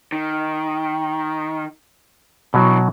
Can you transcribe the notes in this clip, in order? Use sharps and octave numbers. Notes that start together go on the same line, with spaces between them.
D#3
C2 B2 E3 F#3